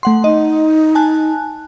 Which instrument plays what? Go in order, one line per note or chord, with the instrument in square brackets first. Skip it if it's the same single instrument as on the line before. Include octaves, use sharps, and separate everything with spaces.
[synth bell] A3 F#5 C6
[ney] D#4 [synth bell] D#5
[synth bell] G#5 A5 F#6